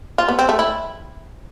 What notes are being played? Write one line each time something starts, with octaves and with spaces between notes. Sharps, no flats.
F4
B3
C4
A3
E4